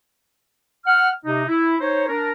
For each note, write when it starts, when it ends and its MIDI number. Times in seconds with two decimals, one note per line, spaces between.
0.86 1.11 78
0.86 1.11 89
1.25 1.44 48
1.25 1.44 63
1.48 1.76 64
1.80 2.08 63
1.80 2.08 72
1.80 2.08 73
2.09 2.32 62
2.09 2.32 70